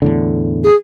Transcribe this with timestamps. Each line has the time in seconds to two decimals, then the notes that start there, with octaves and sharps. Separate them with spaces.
0.02 E2 A2 D3
0.64 G#4